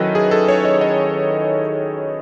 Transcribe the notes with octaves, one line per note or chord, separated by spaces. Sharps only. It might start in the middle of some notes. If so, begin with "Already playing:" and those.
Already playing: D#3 F#3 C#4 E4 A4 B4 D#5
G#4
A4
C#5
D#5
D#5